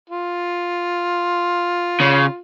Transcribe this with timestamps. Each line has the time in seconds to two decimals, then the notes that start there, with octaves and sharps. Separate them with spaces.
0.10 F4
2.01 C#3